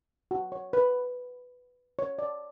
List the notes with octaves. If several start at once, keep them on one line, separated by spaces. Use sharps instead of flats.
F#4
C#5
B4
C#5
D5